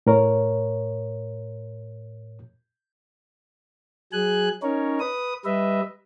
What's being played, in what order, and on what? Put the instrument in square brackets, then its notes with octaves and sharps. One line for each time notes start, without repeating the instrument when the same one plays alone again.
[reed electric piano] A2 A#4 C#5
[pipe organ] F#3 G#4 G#5 F#6
C#4 D#4 A#4 C#5
B4 D#6
G3 B4 D#5 E5